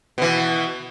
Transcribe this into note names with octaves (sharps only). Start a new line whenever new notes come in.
B2 E3